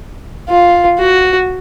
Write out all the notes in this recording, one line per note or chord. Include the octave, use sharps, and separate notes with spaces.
F4
F#4